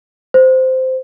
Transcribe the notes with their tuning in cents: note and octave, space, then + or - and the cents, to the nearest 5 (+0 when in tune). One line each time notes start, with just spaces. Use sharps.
C5 -10